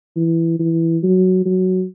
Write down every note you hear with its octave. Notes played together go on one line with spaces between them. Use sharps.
E3
E3
F#3
F#3